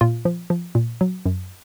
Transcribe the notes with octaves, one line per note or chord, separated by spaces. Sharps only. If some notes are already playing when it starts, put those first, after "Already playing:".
A#2 F4
F3
F3
A#2
F#3
F#2